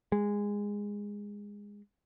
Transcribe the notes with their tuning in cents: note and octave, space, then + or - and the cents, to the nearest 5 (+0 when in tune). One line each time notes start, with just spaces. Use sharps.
G#3 -15